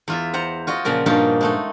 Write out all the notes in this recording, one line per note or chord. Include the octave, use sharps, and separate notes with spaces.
E2 F4 E5
C5 F#5 A#5
F4 F#4 D#5
A#2 C#3 F3 A#4
G2 A#2 F3 A#3 D#4 F#4
G#3 A3 D#4